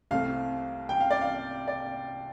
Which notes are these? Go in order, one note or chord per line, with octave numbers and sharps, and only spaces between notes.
C2 C3 A3 C4 F5
G5
F5
D5
F5
D5